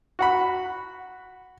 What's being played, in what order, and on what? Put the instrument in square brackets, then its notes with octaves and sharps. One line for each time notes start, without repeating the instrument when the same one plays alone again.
[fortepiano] F#4 F#5 B5